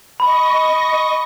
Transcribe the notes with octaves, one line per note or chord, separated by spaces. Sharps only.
D#5 B5 C#6 A#6